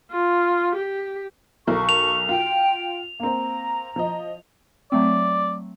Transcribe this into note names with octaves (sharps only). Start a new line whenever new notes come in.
F4
G4
B1 A4 A#4 C#6
F7
F4 G5
A#3 C4 A#5
F3 D#5
F#3 A3 C4 D5